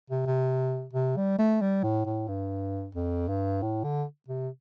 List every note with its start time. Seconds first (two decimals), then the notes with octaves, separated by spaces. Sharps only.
0.10 C3
0.26 C3
0.93 C3
1.17 G3
1.38 A3
1.61 G3
1.83 A2
2.06 A2
2.28 G2
2.95 F2
3.29 G2
3.62 A2
3.84 D3
4.28 C3